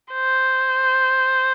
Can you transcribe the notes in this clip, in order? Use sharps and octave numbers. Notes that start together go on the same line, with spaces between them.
C5